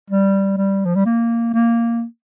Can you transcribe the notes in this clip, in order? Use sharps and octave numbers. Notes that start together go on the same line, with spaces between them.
G3
G3
F3
G3
A#3
A#3